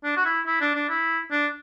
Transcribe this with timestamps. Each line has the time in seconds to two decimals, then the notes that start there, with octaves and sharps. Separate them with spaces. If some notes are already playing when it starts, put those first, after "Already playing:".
0.04 D4
0.17 F#4
0.25 E4
0.46 E4
0.61 D4
0.75 D4
0.89 E4
1.31 D4